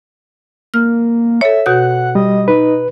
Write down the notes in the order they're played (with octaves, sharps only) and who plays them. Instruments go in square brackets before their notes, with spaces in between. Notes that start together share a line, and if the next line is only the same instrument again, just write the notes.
[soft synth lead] A#3 [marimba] F6
[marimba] A4 C#5 [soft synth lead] E5
[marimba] B2 F#4 G6 [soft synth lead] F#5
[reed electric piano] G3 [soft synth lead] D#5
[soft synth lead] D#4 [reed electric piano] B4